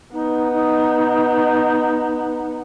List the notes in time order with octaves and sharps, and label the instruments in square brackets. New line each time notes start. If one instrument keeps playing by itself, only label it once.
[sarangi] B3 [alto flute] D#4
[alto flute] D#4